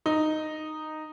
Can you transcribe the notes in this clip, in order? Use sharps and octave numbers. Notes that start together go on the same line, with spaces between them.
D#4